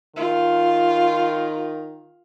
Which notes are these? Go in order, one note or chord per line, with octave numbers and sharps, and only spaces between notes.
D#3 F4